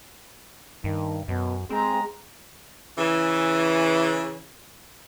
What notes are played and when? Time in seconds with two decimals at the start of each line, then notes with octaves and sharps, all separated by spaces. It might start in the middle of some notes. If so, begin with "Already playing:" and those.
0.84 G2 D#3
1.28 F#2 B2
1.70 G#3 C4 G#4 A#5
2.98 C#3 E3